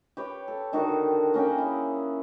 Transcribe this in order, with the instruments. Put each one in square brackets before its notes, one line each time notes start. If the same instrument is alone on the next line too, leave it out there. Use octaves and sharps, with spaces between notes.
[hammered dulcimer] G4 B4 C#5
A4
D3 D#3 D4 F#4
A#3 C#4 F#5 G5
E4 G#4